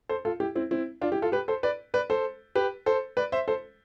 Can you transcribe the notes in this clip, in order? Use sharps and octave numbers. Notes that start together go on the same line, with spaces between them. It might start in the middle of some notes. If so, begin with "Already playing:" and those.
A4 C5
F4 A4
E4 G4
C4 E4
C4 E4
D4 F4
E4 G4
F4 A4
G4 B4
A4 C5
B4 D5
B4 D5
A4 C5
G4 B4
A4 C5
B4 D5
C5 E5
A4 C5